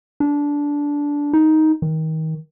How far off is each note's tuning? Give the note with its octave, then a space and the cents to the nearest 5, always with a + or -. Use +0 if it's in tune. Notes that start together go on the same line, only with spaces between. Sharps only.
D4 -15
D#4 +10
D#3 +30